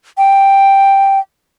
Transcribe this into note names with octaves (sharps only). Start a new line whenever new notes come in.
G5